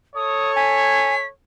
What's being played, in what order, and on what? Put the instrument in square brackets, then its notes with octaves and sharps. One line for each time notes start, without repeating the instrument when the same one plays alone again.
[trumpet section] A4 C#5 [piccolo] D#6
[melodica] G#5 [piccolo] B6